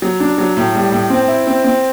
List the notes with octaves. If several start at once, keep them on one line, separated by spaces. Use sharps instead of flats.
F#3
D4
F#3
A2
G3
A2
C4
E4
C4
C4